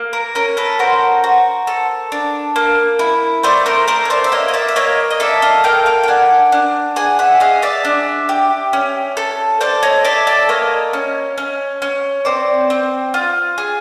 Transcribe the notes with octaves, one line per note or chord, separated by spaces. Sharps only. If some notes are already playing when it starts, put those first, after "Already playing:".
Already playing: A#3
A#4
C#4 A#4
A4 B4
F#4 A#4 C5
F#4
A4
D4
A#3
E4
A3 C5 D5
A#4 C5
A3 A#4 C5
C#5
C5 D5
E5
A#3 C#5 D#5
D#5
D5 E5
E5
A#3 C#5 D#5
D#5
A4 D5 E5
D#5 F5
A#3 F5 G5
F5 G5
G5
D4 F#5 G#5
D4
G#4 F#5 G#5
E5 F#5
G#4 D#5 F5
D5 E5
D4
G4
C#4
A4
A4 C5 D5
C#5 D#5
A4 D5 E5
D5 E5
A#3 C#5 D#5
C#4
C#4
C#4
C4 C5 D5
C4
F4
G#4